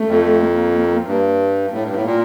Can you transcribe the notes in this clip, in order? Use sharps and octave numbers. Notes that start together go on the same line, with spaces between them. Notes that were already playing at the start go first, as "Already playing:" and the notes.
Already playing: A3
F2
A#3
G2
A2 A#3
G2
A2
A#2